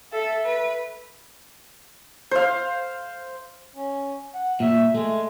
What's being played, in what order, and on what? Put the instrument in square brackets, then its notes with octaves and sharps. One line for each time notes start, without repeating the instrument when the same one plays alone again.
[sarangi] A4 [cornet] E5
[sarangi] B4
[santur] C5 F5
[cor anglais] C#4
F#5
[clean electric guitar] A#2 [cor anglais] E5
[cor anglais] G#3 [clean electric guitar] A3